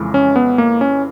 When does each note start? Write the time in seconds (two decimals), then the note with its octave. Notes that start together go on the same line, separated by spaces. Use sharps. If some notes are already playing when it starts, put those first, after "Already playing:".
Already playing: F2 C#3 E3 G#3
0.14 C#4
0.36 B3
0.58 A#3
0.81 C#4